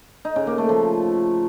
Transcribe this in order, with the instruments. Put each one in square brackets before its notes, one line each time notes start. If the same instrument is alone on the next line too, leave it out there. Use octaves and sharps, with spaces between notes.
[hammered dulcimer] D#4
C#3
A#3
A3
F3